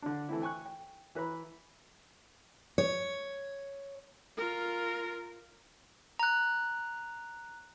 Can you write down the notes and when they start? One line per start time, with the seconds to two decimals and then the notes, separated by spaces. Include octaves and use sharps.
0.02 D3 D4
0.29 E3 A3 C4 E4
0.42 G5 G#5 C#6 F#6
0.66 G5
1.15 E3 B4 A#5 B5
2.78 C#5
4.37 F4 A#4
6.19 A#5 F#6